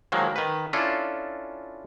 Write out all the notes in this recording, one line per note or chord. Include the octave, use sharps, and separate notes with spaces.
D#3 F3 F#3 G#3 A#3
D#3 B4
C#4 D4 E4 F4 A4